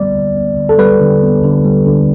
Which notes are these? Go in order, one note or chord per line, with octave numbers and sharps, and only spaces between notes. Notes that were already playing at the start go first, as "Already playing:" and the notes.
Already playing: D3 G3 B3 D5
D3
B3
D3
A4
G3 B4
D3
B3
D3
G3
D3